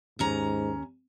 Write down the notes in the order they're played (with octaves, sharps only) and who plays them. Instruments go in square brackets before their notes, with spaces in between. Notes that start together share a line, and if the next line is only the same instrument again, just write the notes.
[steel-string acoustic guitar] D#2 C#4 A#5 [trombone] G#2